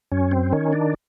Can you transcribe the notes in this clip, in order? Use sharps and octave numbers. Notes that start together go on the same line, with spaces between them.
F#2 C#4
C4
D#3 C#4
D4